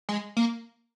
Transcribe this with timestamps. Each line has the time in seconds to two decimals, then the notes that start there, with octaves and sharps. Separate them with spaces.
0.09 G#3
0.37 A#3